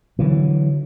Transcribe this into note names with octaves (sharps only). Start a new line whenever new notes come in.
D3 E3 F#3